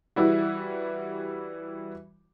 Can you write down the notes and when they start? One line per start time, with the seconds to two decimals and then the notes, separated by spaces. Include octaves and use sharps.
0.16 E3 G3 E4 F#4